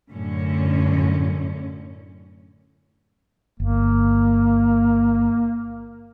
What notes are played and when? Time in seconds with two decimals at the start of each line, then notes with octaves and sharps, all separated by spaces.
0.12 F#2 A2 D3 C#4
3.60 G1 A#3